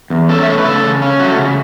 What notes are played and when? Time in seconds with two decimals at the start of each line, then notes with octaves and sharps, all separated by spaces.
0.10 E2
0.29 C#4 A4
0.43 E5
0.47 A3 C#5
0.58 B4
0.65 C#3 A4
0.84 C#3
1.02 C#4
1.20 A3 F#4
1.39 C#3